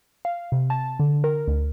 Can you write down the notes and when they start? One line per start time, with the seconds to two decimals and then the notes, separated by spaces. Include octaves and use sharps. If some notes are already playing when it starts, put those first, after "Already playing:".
0.25 F5
0.52 C3
0.70 A5
1.00 D3
1.24 A#4
1.48 D2